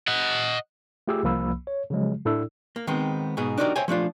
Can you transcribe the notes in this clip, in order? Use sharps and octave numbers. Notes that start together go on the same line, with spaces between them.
D#5 F#5
A3 F4 G4 G#4 E6
C2 F3 A#3 B5 E6
C#5
C#3 F3 F#3 G#3
A2 D4 E4 A4 D5 E6
A#3
D#3 G#3 B3 C4
G#2 B2 G#4
D4 D#4 F#4 G4 A#4 D5
C5 C#5 E5 G5 G#5
F3 A3 D4 F4